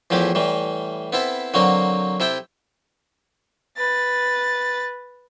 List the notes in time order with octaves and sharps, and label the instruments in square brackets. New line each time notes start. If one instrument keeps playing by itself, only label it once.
[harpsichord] E2 A2 F3 E4 G4 D6
A2 E3 G3
B3 C4 E4 A4
D3 F#3 A#3 C4 F#4
C3 E4 A4 G5
[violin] B4 A6